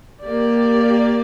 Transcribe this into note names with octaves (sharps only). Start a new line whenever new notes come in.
A#3 G4 D5